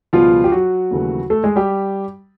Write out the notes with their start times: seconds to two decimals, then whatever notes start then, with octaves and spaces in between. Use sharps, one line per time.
0.13 C#2 B2 F3 G3 B3 F4
0.44 G4
0.52 F#3 F#4
0.91 D#2 C#3 E3 A3
1.30 A3 A4
1.44 G#3 G#4
1.56 G3 G4